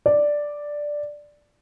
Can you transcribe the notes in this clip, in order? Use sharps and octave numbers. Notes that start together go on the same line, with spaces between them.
D5